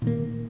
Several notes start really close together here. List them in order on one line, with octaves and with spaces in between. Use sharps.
A#2 D#3 A#3